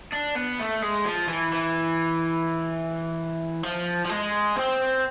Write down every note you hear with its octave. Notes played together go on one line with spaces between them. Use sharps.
D4
B3
A3
G#3
F3
E3
E3
F3
F3
G#3
C4